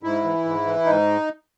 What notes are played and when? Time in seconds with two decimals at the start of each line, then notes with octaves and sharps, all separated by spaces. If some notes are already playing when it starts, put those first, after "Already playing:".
0.03 G#2 E4
0.24 E3
0.45 G#2
0.66 E3
0.86 G#2 D#4